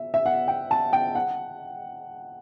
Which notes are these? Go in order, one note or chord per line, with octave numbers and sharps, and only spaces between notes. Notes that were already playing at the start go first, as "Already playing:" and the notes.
Already playing: E5
E5
F#5
G5
A5
G5
F#5